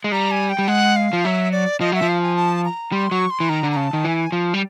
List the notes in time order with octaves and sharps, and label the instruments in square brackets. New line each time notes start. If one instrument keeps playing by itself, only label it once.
[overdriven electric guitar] G#3
[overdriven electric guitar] G3 [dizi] A#5
[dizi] G#5
G5
[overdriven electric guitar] G3
[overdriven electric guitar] G#3 [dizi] F#5
[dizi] F5
[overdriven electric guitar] F3
[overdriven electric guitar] F#3 [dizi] E5
[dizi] D5
[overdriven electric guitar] F3 [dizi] D#5
[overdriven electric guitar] F#3 [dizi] E5
[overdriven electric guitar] F3
[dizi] F5
G#5
A5
A#5
[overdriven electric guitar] G3 [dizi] C6
[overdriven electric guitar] F#3 [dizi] C#6
[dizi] C6
[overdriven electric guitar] E3
[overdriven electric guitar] D#3 [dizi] A#5
[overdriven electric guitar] D3
[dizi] A#5
[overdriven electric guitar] C#3 [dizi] A5
[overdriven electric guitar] D#3
[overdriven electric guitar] E3 [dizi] G#5
[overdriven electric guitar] F3
G3